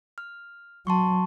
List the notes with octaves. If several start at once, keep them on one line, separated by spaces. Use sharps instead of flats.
F6
F#3 A5 C6 C#6